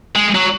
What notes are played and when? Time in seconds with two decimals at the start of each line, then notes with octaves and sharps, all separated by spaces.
0.16 G#3
0.35 F#3